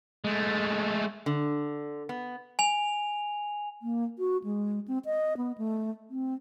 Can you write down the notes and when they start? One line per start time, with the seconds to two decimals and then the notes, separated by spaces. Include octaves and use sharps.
0.24 G#3 A3
1.26 D3
2.09 B3
2.59 G#5 F7
3.82 A#3
4.19 F#4
4.44 G#3
4.88 C4
5.05 D#5
5.37 B3
5.58 A3
6.10 C4